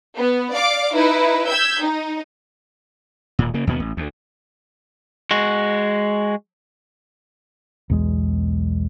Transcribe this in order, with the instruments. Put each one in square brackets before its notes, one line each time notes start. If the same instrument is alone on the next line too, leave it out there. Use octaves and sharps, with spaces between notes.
[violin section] B3
D5 F5 D6
D#4 E4 B4
E6 G6 G#6 B6
D#4
[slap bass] D#1 A#2
C#3 A#3
D#2 B2 B3
A1
D2
[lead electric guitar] G#3 F#4
[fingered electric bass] B1 E2 G#3